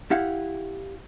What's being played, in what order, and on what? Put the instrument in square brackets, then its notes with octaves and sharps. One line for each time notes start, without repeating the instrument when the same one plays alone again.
[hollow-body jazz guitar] E4 G4 F5 F#5